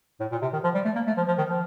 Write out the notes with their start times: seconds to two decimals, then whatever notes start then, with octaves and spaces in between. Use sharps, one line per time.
0.20 A2
0.31 A#2
0.42 C3
0.53 D#3
0.64 F3
0.74 G3
0.85 A3
0.95 A#3
1.07 A3
1.17 F3
1.27 F3
1.38 D#3
1.49 F3